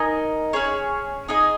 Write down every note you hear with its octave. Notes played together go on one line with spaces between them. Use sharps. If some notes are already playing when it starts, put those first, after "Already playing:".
Already playing: D#4 A#4 D#5 G#5
C#4 G#4 C#5
D#4 G#4 D#5 G#5